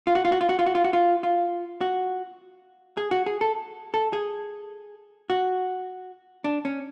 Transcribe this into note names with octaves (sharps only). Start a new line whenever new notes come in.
F4
F#4
F4
F#4
F4
F#4
F4
F#4
F4
F#4
F4
F4
F#4
G#4
F#4
G#4
A4
A4
G#4
F#4
D4
C#4